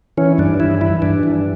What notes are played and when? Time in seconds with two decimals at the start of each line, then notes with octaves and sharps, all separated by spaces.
0.17 E3 C#4
0.38 G2 D4
0.60 E3 E4
0.81 E3 E4
1.02 G2 D4
1.23 E3